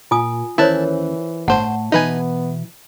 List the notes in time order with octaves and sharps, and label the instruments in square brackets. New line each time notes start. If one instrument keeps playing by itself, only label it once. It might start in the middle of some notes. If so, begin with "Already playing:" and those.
[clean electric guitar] A#2 [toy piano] F4 G#5 D#6
[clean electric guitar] D#2 C#4 [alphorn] E3 [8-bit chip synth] E4 A5 [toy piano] A#4 C5 C#5
[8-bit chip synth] G1 C5 [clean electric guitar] A2 [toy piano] F#5 A5
[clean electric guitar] B2 E3 E5 [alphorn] B3 [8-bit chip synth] D#4 B4 G#5